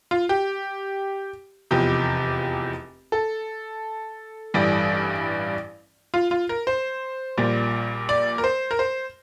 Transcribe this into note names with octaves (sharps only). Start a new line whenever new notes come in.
F4
G4
F1 E2 C3 F3 G4
A4
A1 G2 E3 G3
F4
F4
A#4
C5
A#1 A#2 G3
D5
A#4
C5
A#4
C5